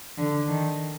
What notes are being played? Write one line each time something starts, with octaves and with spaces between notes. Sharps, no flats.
D3
D#3